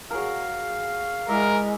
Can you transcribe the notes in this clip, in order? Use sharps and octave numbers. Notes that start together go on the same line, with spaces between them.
F#3 G#4 A#4 F5
G#3 E4 A#4 D5 E5